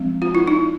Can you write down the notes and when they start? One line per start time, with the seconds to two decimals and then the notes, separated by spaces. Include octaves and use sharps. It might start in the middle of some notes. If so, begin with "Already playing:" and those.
Already playing: F3 G#3 C4
0.22 F4
0.35 E4
0.47 D#4